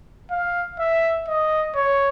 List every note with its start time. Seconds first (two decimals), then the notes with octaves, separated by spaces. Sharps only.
0.31 F5
0.79 E5
1.28 D#5
1.75 C#5